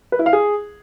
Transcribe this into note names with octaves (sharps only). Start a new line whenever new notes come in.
B4
E4
F5
G#4